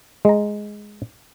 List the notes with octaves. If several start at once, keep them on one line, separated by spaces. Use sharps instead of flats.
G#3 A#5